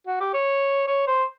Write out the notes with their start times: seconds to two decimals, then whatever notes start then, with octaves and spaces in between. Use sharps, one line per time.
0.07 F#4
0.20 G4
0.33 C#5
0.87 C#5
1.07 C5